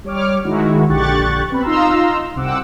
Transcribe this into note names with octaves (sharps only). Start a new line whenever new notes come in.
G3 C#5 D6 F6
D#3 G#3 E4 F#4
A#1 D3 G4 C#6 F#6 A6
B3 C4 B5
D#4 F4 F5 A#5 C6 E6
C2 C3 C4 F#5 D6 E6